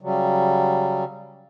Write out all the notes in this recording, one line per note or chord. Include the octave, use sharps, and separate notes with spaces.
C#3 F#3 G3